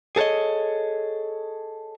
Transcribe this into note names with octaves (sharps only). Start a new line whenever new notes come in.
G#4 A4 B4 C#5 D#5